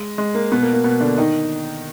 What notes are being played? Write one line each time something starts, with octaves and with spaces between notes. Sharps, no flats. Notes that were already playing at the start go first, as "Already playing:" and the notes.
Already playing: G#3
G#3
A#3
B2 B3
A#3
A#3
B2 B3
D3 D4
D#3 D#4